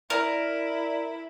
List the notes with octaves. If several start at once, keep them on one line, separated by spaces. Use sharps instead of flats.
E4 A#4 D5